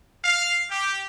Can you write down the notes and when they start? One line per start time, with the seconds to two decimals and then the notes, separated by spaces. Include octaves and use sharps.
0.23 F5
0.69 G4